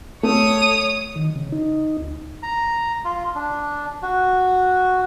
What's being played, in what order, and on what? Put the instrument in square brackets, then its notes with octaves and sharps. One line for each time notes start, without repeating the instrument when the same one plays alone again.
[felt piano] A3 [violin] C#5 D#6
[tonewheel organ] D#3
C#3
D#4
D2
[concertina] A#5
F4
D4
F#4